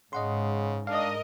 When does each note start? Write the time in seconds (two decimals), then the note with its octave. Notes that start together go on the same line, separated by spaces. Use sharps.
0.13 G#2 C#3 D#5 F#5 C6
0.87 D4 A#4 D#5 F5